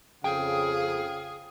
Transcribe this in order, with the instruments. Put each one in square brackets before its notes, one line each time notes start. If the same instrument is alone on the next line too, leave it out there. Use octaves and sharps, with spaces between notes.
[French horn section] F2 C#3 [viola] G#4 [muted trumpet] F5 [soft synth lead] G5